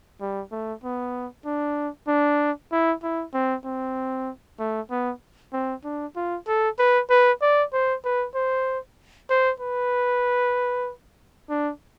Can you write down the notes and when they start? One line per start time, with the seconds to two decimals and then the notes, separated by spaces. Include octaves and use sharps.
0.21 G3
0.52 A3
0.84 B3
1.45 D4
2.08 D4
2.72 E4
3.03 E4
3.34 C4
3.65 C4
4.59 A3
4.91 B3
5.53 C4
5.84 D4
6.16 F4
6.47 A4
6.79 B4
7.10 B4
7.42 D5
7.73 C5
8.04 B4
8.35 C5
9.30 C5
9.60 B4
11.49 D4